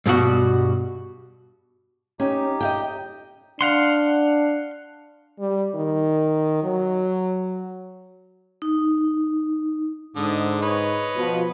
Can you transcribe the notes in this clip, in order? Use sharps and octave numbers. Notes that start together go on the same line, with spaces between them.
G2 B2 G3 F#4
C#4 D#4 G4
D#5 F5 G5
D4 F5 F#5 C6
G3
D#3
F#3
D#4
G#2 D3 D#6
B4 C#5 D#5
B2 F3